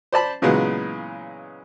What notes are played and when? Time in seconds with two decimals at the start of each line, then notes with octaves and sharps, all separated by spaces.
0.12 C5 D5 A5 B5
0.42 A#2 C#3 E3 F#3 G#3 B3